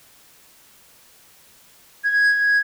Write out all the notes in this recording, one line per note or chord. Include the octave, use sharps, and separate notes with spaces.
G#6